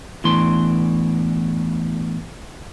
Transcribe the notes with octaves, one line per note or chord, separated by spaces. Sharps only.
E2 A2 E3 D4 C6